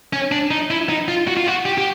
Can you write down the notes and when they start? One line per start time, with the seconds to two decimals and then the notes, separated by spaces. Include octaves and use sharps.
0.13 C#4
0.32 D4
0.51 D#4
0.71 E4
0.89 D#4
1.08 F4
1.27 F#4
1.37 F4
1.47 F#4
1.65 G4
1.78 G4